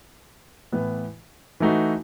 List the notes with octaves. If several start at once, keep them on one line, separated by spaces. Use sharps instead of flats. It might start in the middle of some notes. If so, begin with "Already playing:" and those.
A2 E3 B3
E3 A3 D#4 F#4